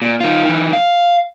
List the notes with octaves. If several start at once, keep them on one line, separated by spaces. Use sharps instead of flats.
A#2
D#3 F4
D#3 E3
F5